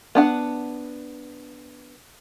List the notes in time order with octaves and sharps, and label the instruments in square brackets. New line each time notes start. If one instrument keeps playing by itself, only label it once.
[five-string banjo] B3 D4 F#5